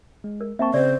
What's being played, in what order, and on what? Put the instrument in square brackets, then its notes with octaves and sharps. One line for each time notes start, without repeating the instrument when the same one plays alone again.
[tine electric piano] G#3
[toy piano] A#4
[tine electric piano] A#3 C4 A5 [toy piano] E5 C#6
[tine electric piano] C#3 C4 [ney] C5 [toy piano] D5